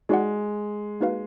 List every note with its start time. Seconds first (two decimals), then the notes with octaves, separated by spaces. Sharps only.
0.09 G#3 D#4 F#4 D5 F#5
1.00 A#3 D#4 F#4 B4 F5